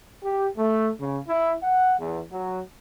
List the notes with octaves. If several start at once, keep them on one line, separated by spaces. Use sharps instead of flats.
G4
A3
C#3
E4
F#5
E2
F#3